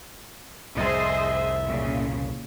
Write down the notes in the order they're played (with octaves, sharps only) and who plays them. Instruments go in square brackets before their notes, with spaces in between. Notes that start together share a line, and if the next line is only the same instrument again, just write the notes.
[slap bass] C2 F2 A2 [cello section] G#4 C5 D#5 [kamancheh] E5
[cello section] A#2 C#3